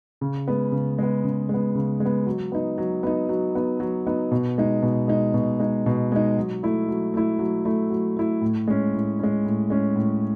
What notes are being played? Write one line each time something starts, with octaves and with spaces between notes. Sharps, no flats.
C#3
G#3 B3
C#3
G#3 B3
C#3
G#3 B3
C#3
G#3
B3
F#3
B3 D#4
F#3
B3 D#4
F#3
B3 D#4
F#3
B3 D#4
B2
G#3 D#4
B2
G#3 D#4
B2
G#3 D#4
B2
G#3 D#4
F#3
A3 E4
F#3
A3 E4
F#3
A3 E4
F#3
A3 E4
A2
G#3 C#4
A2
G#3 C#4
A2
G#3 C#4
A2